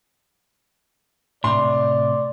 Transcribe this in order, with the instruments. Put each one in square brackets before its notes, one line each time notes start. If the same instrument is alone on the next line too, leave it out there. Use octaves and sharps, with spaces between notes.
[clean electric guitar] A2 C3 [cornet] D5 [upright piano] C6